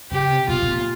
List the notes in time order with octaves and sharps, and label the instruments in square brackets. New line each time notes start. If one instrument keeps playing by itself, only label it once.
[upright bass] C#3 [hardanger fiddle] G4
[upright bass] C3
[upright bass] B2 [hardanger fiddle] F4
[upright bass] B2
A#2